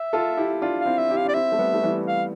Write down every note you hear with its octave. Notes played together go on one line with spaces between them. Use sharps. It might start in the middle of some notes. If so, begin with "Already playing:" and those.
Already playing: E5
F4 A4
E4 G4
D4 F4
F5
C4 E4
E5
E4 G4
F5
D4 D5
C4 E4 E5
A3
G3 B3
A3
E3 G3
F5